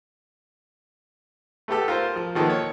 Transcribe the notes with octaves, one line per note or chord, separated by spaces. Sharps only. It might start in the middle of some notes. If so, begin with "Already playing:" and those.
A3 B3 G4 A4
F4 A#4 C5
F3
D#3 F3 A#3 B3 A4
C#5